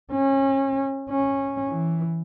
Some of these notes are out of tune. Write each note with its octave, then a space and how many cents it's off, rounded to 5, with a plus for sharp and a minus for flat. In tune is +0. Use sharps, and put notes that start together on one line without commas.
C#4 -30
C#4 -15
E3 +0